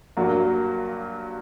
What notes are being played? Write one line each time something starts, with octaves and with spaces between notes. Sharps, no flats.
G2 F#3 A#3 F#4